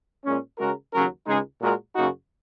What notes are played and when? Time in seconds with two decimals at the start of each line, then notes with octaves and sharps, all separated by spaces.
0.25 A#2 G#3 C#4
0.58 C#3 G#3 F#4 A#4
0.93 D#2 C#3 F#3 C#4 A#4
1.26 C#2 C#3 G#3 D#4 G#4
1.60 A#2 G#3 F#4 A#4
1.94 F#2 C#3 A#3 D#4 F#4